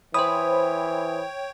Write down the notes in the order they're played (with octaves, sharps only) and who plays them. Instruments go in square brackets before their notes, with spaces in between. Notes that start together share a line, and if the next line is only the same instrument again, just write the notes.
[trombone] E3 [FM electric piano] C5 B5 [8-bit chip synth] C#5 G5 [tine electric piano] D#6